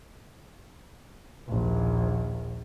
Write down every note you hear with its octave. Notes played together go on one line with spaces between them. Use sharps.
A#1 D#2